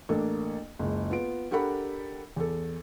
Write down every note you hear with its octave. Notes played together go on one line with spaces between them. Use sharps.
A1 A#3 D4 A4
F#1 C#2
B3 F4 D7
D4 G4 A4 A#4 F#5 B5
E2 A4